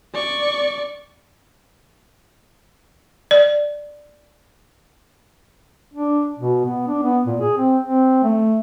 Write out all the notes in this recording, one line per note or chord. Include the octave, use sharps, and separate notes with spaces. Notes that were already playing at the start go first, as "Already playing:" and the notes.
D5 C#6
D5
D4
B2
B3
D4
B3
A#2
G#4
C4
C4
A3